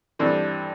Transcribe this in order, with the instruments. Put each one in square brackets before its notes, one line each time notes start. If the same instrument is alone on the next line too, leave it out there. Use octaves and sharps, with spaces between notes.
[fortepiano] G2 E3 C4 A4